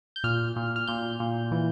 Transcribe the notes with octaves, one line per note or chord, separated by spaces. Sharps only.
G6
A#2 F6
A#2
F6
A#2 G6
A#2
E3